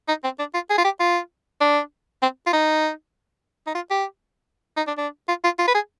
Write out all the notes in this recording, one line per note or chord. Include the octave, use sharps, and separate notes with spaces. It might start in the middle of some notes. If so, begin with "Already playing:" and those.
D#4
C4
D4
F4
G#4
F4
G4
F4
D4
C4
F4
D#4
D#4
F4
G4
D#4
D4
D4
F4
F4
F4
B4
G#4